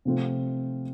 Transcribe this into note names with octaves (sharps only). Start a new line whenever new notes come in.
C3 F3 A3 C4 F4